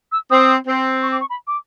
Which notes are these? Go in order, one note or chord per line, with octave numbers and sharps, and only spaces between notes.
E6
C4 D#6
C4
C#6
D6
C#6
B5
D6